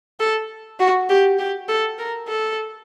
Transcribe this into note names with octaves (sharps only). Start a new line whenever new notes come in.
A4
F#4
G4
G4
A4
A#4
A4